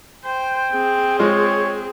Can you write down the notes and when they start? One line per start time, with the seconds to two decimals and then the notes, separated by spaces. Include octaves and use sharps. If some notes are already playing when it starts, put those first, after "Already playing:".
0.24 C5 G5
0.72 C4 G#4
1.19 G#3 F4 C#5